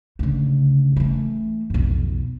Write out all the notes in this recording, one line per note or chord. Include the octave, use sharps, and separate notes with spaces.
D2 C#3
E3 A3
B1 F2